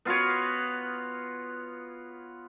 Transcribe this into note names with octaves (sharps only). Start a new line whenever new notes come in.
B3 F4 F#4 C#5